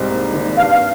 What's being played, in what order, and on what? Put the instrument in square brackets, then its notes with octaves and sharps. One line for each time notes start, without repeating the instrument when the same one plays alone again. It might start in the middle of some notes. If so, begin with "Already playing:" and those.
Already playing: [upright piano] C2 G#2 G3 C4
A#3
G#1
[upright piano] G2 [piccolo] F5
[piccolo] F5